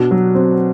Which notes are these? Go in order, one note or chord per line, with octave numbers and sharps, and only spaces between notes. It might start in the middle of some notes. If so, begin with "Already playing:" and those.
Already playing: B2 D4
F#3
C4